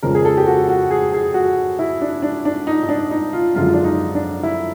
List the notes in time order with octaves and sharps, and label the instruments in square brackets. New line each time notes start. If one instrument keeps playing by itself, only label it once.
[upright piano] F2 C#3 F3 G#3 A#4
G#4
A4
G4
F#4
F#4
G#4
G#4
F#4
E4
D4
D4
D4
D#4
D#4
D4
D#4
F4
F#2 D3 F3 G#3 F4
D4
D#4
D4
E4